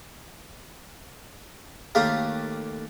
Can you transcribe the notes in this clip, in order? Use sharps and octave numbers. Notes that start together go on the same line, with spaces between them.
D#2 A3 G4 F5 A#5